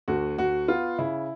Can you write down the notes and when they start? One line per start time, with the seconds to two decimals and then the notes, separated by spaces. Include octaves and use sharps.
0.08 D2 F#4
0.38 D2 F#4
0.68 B3 F4
0.99 C#3 E4